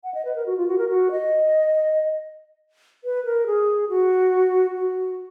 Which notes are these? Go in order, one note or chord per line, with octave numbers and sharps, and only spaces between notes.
F#5
D#5
B4
A#4
F#4
F4
F#4
A#4
F#4
D#5
B4
A#4
G#4
F#4
F#4